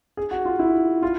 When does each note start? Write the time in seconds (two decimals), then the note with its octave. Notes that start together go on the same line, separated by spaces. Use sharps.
0.17 G#4
0.31 F#4
0.45 F4
0.59 E4
1.03 F4